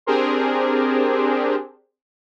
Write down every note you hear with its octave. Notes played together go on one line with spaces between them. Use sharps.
C4 D4 G4 G#4 A#4 C5